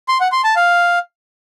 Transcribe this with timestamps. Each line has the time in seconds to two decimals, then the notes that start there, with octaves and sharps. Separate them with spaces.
0.08 C6
0.20 F#5
0.32 C6
0.44 A5
0.56 F5